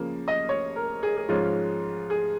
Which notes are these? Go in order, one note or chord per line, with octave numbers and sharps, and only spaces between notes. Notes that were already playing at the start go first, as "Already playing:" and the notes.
Already playing: C#3 F3 A#3
D#5
C#5
A#4
G#4
G#4
G#2 F3 G#3 C#4 F4
G#4